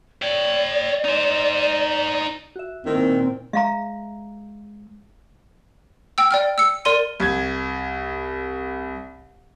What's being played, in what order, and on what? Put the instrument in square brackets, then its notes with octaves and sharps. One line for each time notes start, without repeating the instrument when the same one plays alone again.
[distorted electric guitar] C#5 G5 [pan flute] D5
[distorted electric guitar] D#4 C5
[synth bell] F#4 E5
[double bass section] A#2 C4 [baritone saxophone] D#3 [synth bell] E4 A#4
[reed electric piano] G#3 [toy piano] E5 F5 A#5
[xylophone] G5 E6
D5 G5 F6
E6 C#7
A#4 D5 C6 D#7
[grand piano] C2 G#6